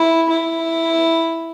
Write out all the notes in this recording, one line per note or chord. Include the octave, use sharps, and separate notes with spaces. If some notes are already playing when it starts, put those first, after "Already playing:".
Already playing: E4
E4